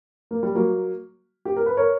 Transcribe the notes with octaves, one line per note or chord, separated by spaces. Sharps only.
A#3
G3
F#3 A#3
G4
A#4
B4
A#4 C#5